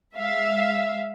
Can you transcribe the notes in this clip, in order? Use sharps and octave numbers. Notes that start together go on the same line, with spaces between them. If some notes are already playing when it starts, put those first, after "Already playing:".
G#3 E5 F5